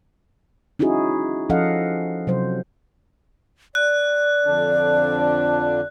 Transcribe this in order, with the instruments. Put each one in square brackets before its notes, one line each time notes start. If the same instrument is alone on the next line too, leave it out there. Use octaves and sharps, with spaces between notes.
[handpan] C#4 D#4 E4 F#4 G#4
F3 C#4 A4 D#5 F5 F#5
C3 F#3 C5
[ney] D5 [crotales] F#6
[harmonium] F2 D3 D4